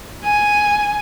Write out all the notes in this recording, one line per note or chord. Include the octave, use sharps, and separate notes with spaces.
G#5